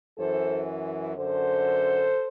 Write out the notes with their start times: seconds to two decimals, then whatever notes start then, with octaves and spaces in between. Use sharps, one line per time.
0.18 F#2 E3 A4 C5
1.16 F#2 D3 A4 C5